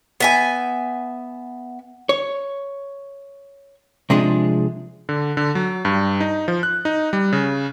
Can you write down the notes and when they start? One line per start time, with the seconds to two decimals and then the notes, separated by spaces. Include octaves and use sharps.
0.20 B3 E5 G#5
2.09 C#5
4.10 C3 F3 G#3 D4 G#4
5.09 D3
5.37 D3
5.55 F#3
5.85 G2
6.20 D#4
6.48 F3
6.63 F#6
6.85 D#4
7.13 G3
7.33 C#3